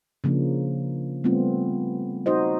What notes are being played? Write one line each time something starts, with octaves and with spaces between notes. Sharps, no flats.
C#3 F3 A#3 D4
G3 A3 B3 C4 F4
D#4 F#4 C5 D#5